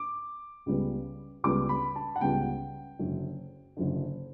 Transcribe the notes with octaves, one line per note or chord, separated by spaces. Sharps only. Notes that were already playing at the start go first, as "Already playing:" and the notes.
Already playing: D6
C#2 C#3 G3 B3
C#2 C#3 G3 B3 D6
B5
A5
F#5
C#2 C#3 G3 B3 G5
F#1 F#2 D3
F#1 F#2 D3